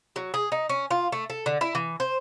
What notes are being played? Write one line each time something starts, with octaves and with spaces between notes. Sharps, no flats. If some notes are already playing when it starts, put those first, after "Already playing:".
F#3
G#4
D#4
C#4
F4
A3
A4
D3
E4
E3
C5